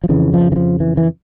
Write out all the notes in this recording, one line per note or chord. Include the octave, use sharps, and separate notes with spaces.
F3
F2 C#3 E3
F3
E3
F3
E3
E3